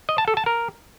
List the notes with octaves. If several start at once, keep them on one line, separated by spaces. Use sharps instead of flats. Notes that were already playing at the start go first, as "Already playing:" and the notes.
D#5
A5
A4
A5
A#4